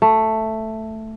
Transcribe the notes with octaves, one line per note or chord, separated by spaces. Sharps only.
A3